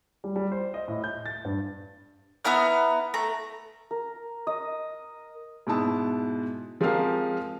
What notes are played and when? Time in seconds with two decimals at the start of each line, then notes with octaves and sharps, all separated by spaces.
0.24 G3
0.36 G3
0.52 C5
0.74 D#5
0.88 A2
1.04 G6
1.26 A6
1.45 G2
2.45 B3 E4 A#5 F6
3.14 A3 A#5
3.91 A#4
4.47 D#5
5.67 G#2 B2 E4 A5 D#6
6.81 F3 G#3 C4 G4 A#4 F5